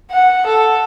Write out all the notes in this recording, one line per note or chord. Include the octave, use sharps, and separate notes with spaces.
F#5
A4